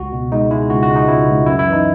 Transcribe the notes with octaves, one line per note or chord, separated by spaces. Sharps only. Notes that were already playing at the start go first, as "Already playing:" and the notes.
Already playing: C#2 F#4
B2
G#3 D#4
G#3 E4
C#2 F#4
F#4
G#3
D#4
C#2 E4
C#2
F#2 E4
E4
E3
D#4